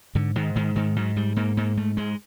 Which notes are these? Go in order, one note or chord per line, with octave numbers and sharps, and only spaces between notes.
G#2 D3
G#2 D#3
G#2 D#3
G#2 D#3
G#2 F#3
G#2 G3
G#2 A#3
G#2 A#3
G#2 A3
G#2 G#3